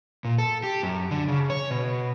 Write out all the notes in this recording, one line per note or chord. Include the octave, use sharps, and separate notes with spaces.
A#2
A4
G4
F#2
D3
C#3
C#5
B2